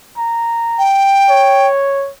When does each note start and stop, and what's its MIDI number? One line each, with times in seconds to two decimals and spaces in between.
0.17 0.86 82
0.78 1.67 79
1.30 2.10 73